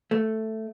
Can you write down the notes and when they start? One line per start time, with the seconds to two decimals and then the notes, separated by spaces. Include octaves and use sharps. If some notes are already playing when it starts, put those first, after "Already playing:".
0.11 A3